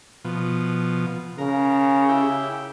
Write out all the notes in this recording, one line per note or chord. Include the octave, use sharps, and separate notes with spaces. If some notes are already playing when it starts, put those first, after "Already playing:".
B2 F3
C#3 A#4
E4 G4